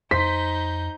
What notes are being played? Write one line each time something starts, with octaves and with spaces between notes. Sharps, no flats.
F2 D#4 C5 G6 B6